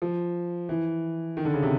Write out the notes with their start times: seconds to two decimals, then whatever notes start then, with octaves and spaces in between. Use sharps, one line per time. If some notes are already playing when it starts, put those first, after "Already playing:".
0.02 F3
0.69 E3
1.37 D#3
1.45 D3
1.54 C#3
1.63 C3